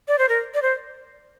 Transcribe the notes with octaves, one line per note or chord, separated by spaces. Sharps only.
D5
C5
A#4
D5
C5